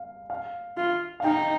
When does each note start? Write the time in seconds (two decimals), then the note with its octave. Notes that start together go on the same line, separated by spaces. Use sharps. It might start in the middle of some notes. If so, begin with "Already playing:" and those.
Already playing: F5
0.30 F5
0.77 F4
1.20 F5
1.24 D#4 G5